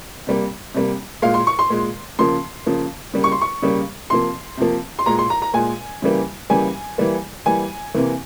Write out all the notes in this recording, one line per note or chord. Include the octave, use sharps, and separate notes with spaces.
C3 G3 A#3
C3 G3 A#3
A#2 G#3 F5
C6
C#6
C6
A#2 G#3
C#3 F3 A#3 C6
C#3 F3 A#3
C#3 G3 A#3
C#6
C6
C#6
C#3 G3 A#3
C3 F3 A#3 C6
C3 F3 A#3
C6
A#2 G#3 A#5
C6
A#5
A#5
A#2 G#3 G#5
C#3 E3 G3 A#3
C#3 E3 G3 A#3 G#5
E3 G3 A#3
E3 G3 A#3 G#5
C3 E3 A#3